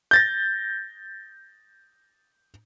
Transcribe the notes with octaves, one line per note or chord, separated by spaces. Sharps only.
G6 A6 A#6